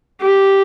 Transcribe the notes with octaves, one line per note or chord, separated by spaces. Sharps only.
G4